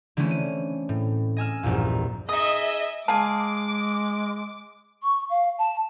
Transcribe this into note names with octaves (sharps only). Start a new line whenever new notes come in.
D3 E3 A3 C4 C#4
D#7
A2
D#5 G#5 E6 F6
A#1 E2 G2 A#2
D#4 G#4 D#5 E5 D#6
G#3 G#4 F5 A5 D6
C#6
F5
A5